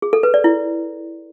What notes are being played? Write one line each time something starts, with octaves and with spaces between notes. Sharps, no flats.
G#4
A4
B4
D5
E4